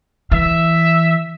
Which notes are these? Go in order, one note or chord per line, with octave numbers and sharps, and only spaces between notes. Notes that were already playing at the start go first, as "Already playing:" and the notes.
E3 E5